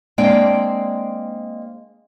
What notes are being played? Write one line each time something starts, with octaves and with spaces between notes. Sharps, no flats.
G#3 A#3 C4 D4 D5 G5